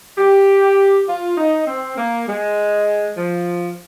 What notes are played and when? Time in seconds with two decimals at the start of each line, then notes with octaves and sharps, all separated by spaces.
0.18 G4
1.07 F4
1.37 D#4
1.67 C4
1.97 A#3
2.27 G#3
3.17 F3